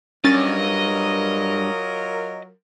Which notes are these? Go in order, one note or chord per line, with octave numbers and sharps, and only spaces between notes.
G2 F#3 C#4 F4 A#4 D#5 A6